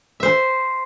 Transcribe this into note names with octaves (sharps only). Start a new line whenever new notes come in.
C5 E5